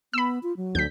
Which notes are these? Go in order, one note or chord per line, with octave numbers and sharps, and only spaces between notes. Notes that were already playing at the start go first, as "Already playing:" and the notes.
B3 B5 E6
F4
F#3
D2 G6 B6